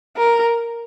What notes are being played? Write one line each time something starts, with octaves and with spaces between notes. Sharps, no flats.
A#4